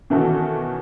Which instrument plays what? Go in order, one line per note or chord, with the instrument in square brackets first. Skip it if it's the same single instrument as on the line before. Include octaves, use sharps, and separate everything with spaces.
[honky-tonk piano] B2 D#3 E3 C#4 F#4 A4